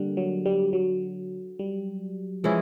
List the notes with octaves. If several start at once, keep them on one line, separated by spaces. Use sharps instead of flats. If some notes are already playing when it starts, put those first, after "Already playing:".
Already playing: D3 G3 A#3
F#3
G3
F#3
G3
E3 F3 G#3 C#4 E4